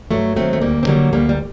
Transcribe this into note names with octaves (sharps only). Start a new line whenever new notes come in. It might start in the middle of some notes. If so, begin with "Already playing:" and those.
G2 F#3 A3
D#3 F#3 A3 C4
A3
D2 G3 A#3
C4
D3 F#3 G3 A#3
D2 G3 A#3
G3